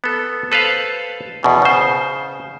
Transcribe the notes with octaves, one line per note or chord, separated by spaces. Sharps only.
B3 A4
A4 B4 C5 F5
E2 B2 E3
C#3 C5